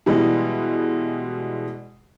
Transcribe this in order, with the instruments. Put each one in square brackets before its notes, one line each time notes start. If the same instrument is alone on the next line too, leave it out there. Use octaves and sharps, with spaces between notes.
[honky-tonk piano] B2 E3 G3 G#3